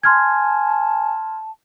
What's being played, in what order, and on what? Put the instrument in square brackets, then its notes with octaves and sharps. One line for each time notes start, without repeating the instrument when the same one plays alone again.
[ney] G#5 [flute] A5 [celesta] C6 F6 G#6